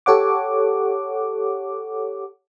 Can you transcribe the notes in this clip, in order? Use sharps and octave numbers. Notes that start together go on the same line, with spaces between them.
G4 A4 C#5 F#5 D6